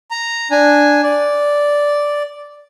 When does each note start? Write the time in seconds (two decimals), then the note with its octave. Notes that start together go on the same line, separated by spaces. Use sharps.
0.11 A#5
0.51 D4 G#5
1.03 D5